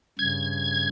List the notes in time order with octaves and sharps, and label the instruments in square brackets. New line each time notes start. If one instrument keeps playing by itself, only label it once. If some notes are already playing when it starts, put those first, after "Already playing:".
[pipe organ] G2 C#3 [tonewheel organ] G#6